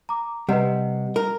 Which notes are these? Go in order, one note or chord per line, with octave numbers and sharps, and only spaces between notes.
A#5 D6
C3 G3 B4 D#5 F#5
A#4